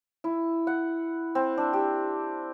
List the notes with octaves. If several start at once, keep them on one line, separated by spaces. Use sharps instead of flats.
E4
F#5
C4
D4
G4